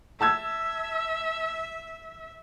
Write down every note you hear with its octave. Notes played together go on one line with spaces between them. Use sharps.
E5 A5 E6 G#6